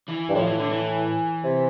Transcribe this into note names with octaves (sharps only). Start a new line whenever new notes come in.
E3
G2
A2 F3
E3
D3
E3
C3